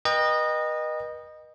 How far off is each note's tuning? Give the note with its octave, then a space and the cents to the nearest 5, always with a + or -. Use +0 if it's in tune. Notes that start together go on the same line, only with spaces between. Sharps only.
B4 -40 D#5 -15 G5 +15